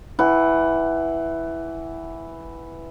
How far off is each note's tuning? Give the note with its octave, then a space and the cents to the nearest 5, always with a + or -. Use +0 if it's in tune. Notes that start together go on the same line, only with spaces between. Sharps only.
E3 +0 E4 +0 F#5 +20